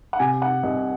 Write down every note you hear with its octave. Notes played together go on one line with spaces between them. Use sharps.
F#5
C3 G#5
F#5
C2 D#5